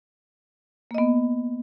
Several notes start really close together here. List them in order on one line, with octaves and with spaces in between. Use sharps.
A#3 D#5 B3